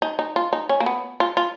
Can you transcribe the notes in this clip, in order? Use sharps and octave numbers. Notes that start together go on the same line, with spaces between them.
D#4
D#4
F4
D#4
C#4
A#3
B3
F4
F4